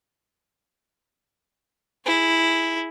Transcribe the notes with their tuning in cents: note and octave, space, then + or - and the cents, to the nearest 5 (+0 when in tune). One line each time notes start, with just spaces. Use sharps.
E4 +0 G#4 +0